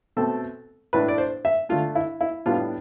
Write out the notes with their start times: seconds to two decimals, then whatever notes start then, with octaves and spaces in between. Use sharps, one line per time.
0.17 B2 A3 C4 A4
0.93 A2 E3 A3 D4 B4
1.08 D5
1.18 C5
1.45 E5
1.69 D3 A3 D4 F4
1.95 E4
2.21 E4
2.46 A2 G3 B3 D4 F4